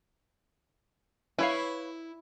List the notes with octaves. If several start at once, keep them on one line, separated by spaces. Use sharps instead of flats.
E4 B4 C#5 F5